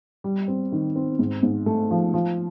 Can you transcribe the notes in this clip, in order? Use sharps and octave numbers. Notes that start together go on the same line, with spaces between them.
G3
C4
D#3
C4
G#2
G#2
A3
F3
F3